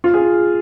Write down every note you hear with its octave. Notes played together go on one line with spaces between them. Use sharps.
F4
G#4